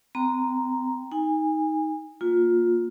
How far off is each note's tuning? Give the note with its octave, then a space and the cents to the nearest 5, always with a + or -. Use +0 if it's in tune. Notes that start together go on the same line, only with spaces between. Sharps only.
C4 -35 G5 +0 A#5 +0
D#4 +15 G#5 -25
A#3 +0 F4 +20